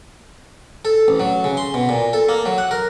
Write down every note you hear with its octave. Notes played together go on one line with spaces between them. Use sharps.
A4
A1
F#3
C#3
C6
B2
A#2
A4
A#3
F#3
F#5
A#4